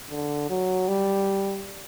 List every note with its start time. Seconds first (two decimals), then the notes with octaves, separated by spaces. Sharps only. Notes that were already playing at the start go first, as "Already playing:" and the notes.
0.10 D3
0.50 F#3
0.88 G3